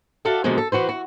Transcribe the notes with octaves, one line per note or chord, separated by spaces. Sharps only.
F#4 A4 D5 E5 F5
B2 D3 E3 F3 G#3 A#3
A4
E3 F#4 B4 C5
F#4